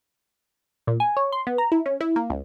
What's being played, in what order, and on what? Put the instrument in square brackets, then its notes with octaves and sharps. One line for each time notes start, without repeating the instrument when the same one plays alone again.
[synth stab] A#2
G#5
C#5
C6
B3
A#5
E4
C#4
E4
A#3
C#2